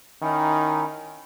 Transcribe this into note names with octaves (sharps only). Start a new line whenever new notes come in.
D#3 C#4 D#4 E4